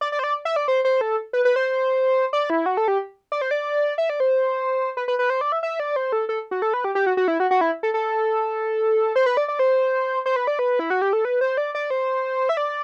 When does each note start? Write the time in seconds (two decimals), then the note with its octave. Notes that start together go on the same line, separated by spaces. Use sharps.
0.01 D5
0.12 D5
0.19 C5
0.24 D5
0.45 E5
0.56 D5
0.68 C5
0.85 C5
1.01 A4
1.33 B4
1.45 B4
1.56 C5
2.33 D5
2.50 E4
2.66 F#4
2.77 A4
2.88 G4
3.32 D5
3.41 C5
3.51 D5
3.98 E5
4.10 D5
4.20 C5
4.97 B4
5.08 B4
5.19 B4
5.30 C5
5.41 D5
5.52 E5
5.63 E5
5.80 D5
5.96 C5
6.12 A4
6.29 A4
6.51 F#4
6.62 A4
6.74 B4
6.84 G4
6.95 G4
7.06 F#4
7.17 F#4
7.28 E4
7.40 F#4
7.51 F#4
7.61 E4
7.83 A4
7.94 A4
9.16 C5
9.26 B4
9.37 D5
9.48 D5
9.59 C5
10.26 C5
10.36 B4
10.47 D5
10.59 B4
10.79 E4
10.90 F#4
11.02 G4
11.13 A4
11.25 B4
11.41 C5
11.57 D5
11.75 D5
11.90 C5
12.49 E5
12.57 D5